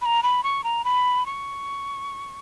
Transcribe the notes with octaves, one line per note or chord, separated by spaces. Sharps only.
B5
A#5
B5
C#6
A#5
B5
C#6